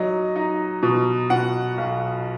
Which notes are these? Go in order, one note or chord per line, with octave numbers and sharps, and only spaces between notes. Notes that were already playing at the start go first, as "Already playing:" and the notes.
Already playing: F#3 D#4 D#5
D#4
B2
B2 F#5
B1